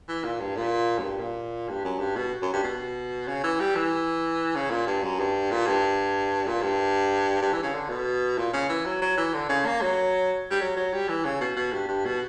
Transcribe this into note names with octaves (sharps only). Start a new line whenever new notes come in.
E3
A#2
G2
A#2
F#2
G2
A#2
G2
F#2
G2
B2
F#2
G2
B2
C#3
E3
G3
E3
C#3
A#2
G2
F#2
G2
A#2
G2
A#2
G2
G2
E3
C#3
D3
B2
A#2
C#3
E3
F#3
F#3
E3
D3
C#3
A#3
F#3
G3
F#3
F#3
G3
E3
C#3
B2
B2
G2
G2
B2